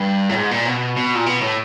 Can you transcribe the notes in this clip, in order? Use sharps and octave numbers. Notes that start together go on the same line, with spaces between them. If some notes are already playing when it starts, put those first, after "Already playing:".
Already playing: G2
A2
G#2
A#2
B2
B2
A#2
B2
A2